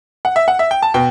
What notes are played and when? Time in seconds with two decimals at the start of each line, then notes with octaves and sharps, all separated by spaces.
0.25 F#5
0.36 E5
0.48 F#5
0.59 E5
0.71 G5
0.82 A5
0.94 B2 G5